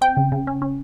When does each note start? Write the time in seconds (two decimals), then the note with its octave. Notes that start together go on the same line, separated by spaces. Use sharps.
0.01 C4 G5
0.17 C#3
0.32 C#3
0.47 C#4
0.62 C#4